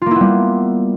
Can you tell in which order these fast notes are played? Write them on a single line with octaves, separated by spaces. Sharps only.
F4 A#3 E4 B3 G3